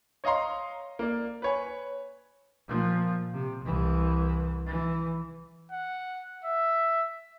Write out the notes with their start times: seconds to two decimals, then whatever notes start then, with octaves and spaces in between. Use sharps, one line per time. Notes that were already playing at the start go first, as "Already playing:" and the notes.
0.24 C#5 D#5 F5 A#5 C6
0.99 A#3 D5
1.42 B4 C#5 G#5
2.68 A#2 F3
3.34 C3
3.64 C2 E3
4.66 E3
5.71 F#5
6.44 E5